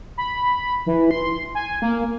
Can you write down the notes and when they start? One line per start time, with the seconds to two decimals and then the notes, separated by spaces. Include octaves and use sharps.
0.18 B5
0.86 E3
1.11 C6
1.55 G#5
1.82 A#3